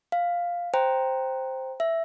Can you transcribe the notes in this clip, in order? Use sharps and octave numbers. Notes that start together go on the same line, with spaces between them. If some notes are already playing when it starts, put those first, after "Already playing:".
F5
C5 G5 A#5
E5